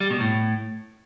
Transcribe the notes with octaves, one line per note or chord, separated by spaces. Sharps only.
G3
B2
A2